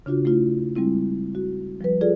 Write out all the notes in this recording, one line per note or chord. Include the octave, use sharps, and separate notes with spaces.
C#3 D4 F4 F#4
A3 E4 F4
G3 G#3 C4 E4
F#4
F3 G3 B4
F4 G#4 A4 D5